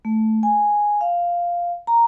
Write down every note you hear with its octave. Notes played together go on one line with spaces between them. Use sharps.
A3
G#5
F5
A#5